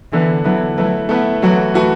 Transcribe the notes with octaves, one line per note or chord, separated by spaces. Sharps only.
D3 E3 B3 E4 B4
D3 F#3 B3 E4 B4
F#3 A3 E4 B4
A3 B3 E4 B4
E3 F#3 A3 F#4 B4
E3 A3 F#4 B4